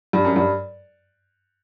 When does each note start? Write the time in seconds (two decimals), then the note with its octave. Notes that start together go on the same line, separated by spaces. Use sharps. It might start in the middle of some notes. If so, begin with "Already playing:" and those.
0.13 G2
0.25 F#2
0.36 G2